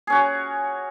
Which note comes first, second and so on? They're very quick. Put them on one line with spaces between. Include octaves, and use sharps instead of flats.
G#4 C#4 F#4 C#5